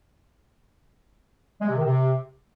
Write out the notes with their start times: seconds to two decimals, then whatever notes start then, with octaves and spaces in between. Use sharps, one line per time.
1.61 G#3
1.69 C3
1.77 D#3
1.85 C3